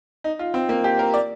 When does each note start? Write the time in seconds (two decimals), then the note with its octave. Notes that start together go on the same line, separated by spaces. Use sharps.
0.24 D#4
0.39 F4
0.54 C4
0.69 A#3
0.84 G4
0.99 A#4
1.14 D5